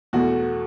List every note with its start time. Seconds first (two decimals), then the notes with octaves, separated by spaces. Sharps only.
0.13 E2 B2 A3 F#4